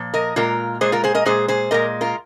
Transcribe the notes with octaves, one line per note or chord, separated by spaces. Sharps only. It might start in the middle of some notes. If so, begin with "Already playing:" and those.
Already playing: A#2 F3
A#4 D#5
A#2 G#3 F4 A#4
A#2 G#3 G#4 C5
F4 A#4
G#4 C5
A#4 D#5
A#2 G#3 G#4 C5
G#4 C5
A#2 G#3 A#4 D#5
F4 A#4